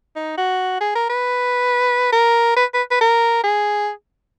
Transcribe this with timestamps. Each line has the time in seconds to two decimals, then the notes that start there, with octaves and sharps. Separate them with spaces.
0.16 D#4
0.38 F#4
0.81 G#4
0.95 A#4
1.10 B4
2.13 A#4
2.56 B4
2.74 B4
2.91 B4
3.01 A#4
3.44 G#4